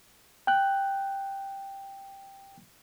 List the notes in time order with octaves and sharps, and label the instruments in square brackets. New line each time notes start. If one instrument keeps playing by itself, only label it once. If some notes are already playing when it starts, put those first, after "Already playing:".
[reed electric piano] G5 F#6